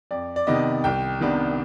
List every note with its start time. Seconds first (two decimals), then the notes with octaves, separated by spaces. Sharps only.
0.11 F2 D5
0.36 D5
0.47 C3 D#3 B3 D#5
0.84 C2 G5
1.21 C3 D#3 B3 D4